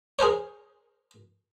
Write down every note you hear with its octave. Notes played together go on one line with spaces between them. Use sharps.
G#4 A#4 C5 C#5